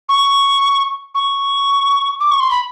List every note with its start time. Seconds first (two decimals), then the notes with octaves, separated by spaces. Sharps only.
0.09 C#6
1.14 C#6
2.20 D6
2.31 C#6
2.40 C6
2.50 B5